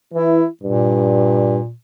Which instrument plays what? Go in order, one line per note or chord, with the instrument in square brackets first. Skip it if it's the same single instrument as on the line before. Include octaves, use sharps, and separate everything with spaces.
[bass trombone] E3 [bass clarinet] E4
[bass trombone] G2 [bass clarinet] A#2